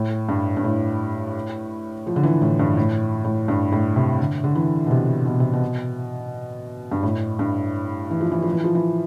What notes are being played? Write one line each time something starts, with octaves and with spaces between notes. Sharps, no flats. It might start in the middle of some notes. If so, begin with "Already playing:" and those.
Already playing: A2
G2
G2
A2
F3
D3
E3
A2
G2
A2
A2
G2
A2
C3
D3
D3
E3
B2
C3
B2
C3
B2
G2
A2
G2
E3
F3
E3
F3
E3
F3
E3